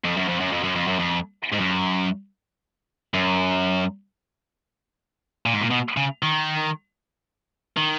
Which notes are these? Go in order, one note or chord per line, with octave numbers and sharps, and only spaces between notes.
F2
F#2
F2
F#2
F2
F#2
F2
F#2
F2
G#2
F#2
F#2
A#2
G#2
A#2
B2
C#3
D#3
D#3